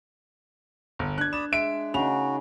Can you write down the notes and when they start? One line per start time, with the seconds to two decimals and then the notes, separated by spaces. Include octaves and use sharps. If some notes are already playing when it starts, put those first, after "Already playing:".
0.99 G1
1.18 D4 F#6 G#6
1.33 D5 B5 D#6 E7
1.52 G#3 E5 D7
1.94 C#3 D#4 F#4 F7